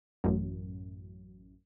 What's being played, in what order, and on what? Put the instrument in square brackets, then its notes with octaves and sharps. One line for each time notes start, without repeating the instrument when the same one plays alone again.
[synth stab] A1 F#2